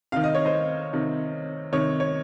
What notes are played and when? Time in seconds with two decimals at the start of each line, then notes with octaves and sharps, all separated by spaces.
0.12 C3 D#3 F5
0.24 D#5
0.35 C#5
0.45 C5 D#5
0.93 C3 D#3
1.72 C3 D#3 C#5
2.00 C#5